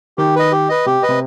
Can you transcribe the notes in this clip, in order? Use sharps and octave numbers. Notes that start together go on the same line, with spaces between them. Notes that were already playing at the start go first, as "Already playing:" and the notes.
D#3 G4
B4 D#5
G4
B4 D#5
C3 G4
B4 D#5
C3